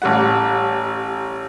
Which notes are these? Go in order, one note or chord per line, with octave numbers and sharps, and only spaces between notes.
A1 G3 F#5